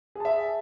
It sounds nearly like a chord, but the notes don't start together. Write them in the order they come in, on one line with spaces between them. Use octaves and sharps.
G#4 A5 E5